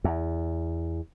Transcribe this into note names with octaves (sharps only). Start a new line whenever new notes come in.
E2